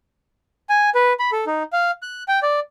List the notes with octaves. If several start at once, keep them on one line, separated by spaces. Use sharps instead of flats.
G#5
B4
B5
A4
D#4
F5
F#6
G5
D5